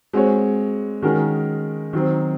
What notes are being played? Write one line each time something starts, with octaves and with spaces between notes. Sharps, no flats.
G#3 C4 F#4 C#5
D#3 G#3 C#4 F#4 A#4
D#3 F#3 C4